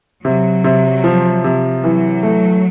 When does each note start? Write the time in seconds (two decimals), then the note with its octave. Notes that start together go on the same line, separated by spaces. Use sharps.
0.25 C3 F#3
0.64 C3
1.04 F3
1.44 C3
1.84 E3 F#3
2.23 A3